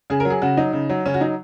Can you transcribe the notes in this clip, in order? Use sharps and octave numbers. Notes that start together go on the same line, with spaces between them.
C#3 G#4
A#4
F#3
G#4
C#3 F#4
F#3 D#4
C#3
F#3
C#3 C#4
F#4
F#3 D#4